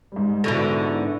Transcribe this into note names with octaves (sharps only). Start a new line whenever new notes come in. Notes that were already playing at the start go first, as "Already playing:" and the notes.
G#2 G3
G#2 B2 D3 E4 C#6 A#6